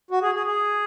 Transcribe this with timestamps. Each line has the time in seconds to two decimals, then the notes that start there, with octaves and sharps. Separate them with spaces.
0.11 F#4
0.22 G#4
0.35 G#4
0.47 G#4